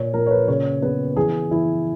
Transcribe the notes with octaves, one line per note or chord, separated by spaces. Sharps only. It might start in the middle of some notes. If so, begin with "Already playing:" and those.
Already playing: A#2 C#5
A#2 A#4
C#5
B4
C#3 C#5
B3 B4
E3 G#4
E3 E4